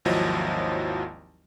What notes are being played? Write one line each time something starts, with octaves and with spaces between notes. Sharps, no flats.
G#1 D#2 F3 F#3 E4 D#5